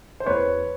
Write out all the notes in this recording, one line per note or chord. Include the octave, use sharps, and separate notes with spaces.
C5
E2 B4 C#5